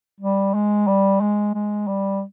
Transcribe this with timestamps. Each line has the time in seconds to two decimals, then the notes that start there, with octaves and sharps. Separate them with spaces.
0.20 G3
0.54 G#3
0.87 G3
1.21 G#3
1.54 G#3
1.87 G3